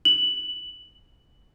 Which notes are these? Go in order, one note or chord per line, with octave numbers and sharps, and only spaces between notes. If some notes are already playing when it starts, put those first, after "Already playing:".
F#7